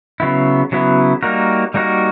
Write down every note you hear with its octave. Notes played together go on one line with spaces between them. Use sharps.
C#3 F#3 B3 E4
C#3 F#3 B3 E4
G3 A#3 D#4 F#4 A#4
G3 A#3 D#4 F#4 A#4